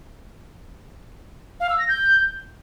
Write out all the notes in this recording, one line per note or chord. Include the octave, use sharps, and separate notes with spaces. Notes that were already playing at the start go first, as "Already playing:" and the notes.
F5
E6
A#6
G6